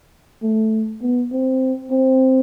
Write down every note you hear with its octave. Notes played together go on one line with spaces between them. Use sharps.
A3
B3
C4
C4